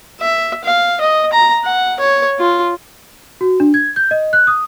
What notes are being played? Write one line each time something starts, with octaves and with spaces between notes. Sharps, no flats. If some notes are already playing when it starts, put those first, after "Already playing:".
E5
F5
D#5
A#5
F#5
C#5
F4
F#4
D4
G#6
G6
D#5
F#6
D#6